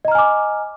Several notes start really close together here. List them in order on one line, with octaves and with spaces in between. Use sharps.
D#5 A#5 F6 G#5 D6